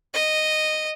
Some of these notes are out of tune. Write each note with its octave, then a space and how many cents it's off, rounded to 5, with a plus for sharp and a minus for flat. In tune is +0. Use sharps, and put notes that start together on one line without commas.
D#5 -10